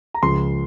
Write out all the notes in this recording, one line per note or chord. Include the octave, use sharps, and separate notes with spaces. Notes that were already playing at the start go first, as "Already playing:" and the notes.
A#5
C#2 C#3 F3 C6